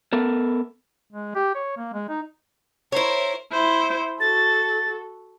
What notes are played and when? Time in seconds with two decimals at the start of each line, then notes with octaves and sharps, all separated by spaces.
0.13 B3 A4 A#4
1.13 G#3
1.35 G4
1.55 C#5
1.77 A#3
1.93 G#3
2.09 D#4
2.92 E4 A#4 C5 C#5
3.52 E4 C5
4.20 F#4 A4 A6